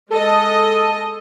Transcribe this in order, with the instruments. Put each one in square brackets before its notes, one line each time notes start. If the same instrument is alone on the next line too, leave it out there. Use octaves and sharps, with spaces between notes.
[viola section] G#3 D#5 [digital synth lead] A4